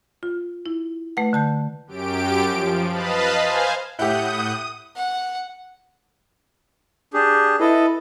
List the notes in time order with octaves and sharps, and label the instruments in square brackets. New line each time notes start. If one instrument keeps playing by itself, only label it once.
[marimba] F4
E4
A3 B4 F#5
D3 A5 G6
[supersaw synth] F#2 G4 D7
F3
B4 D#5 F5 A5 B5
C5 F5 G#5
[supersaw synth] A2 F#5 G6 [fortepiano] E4 G4 [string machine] D#6
[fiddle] F#5
[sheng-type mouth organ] D4 G4 G#4
[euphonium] E4 [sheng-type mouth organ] A4 B4 D#5